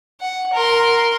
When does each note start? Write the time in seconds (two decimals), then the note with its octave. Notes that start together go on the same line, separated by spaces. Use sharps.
0.21 F#5
0.53 A#4 C6